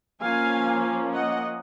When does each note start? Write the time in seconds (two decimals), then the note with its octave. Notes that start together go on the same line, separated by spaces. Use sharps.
0.21 F3 A#3 C#4 F5 G#5
1.14 D#5 F#5